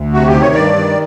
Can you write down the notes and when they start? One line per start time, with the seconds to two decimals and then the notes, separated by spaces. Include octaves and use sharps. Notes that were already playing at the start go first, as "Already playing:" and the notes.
Already playing: D2
0.13 C3 F#4
0.27 G4
0.34 D#3
0.41 C#5
0.55 G2 D5
0.76 D#3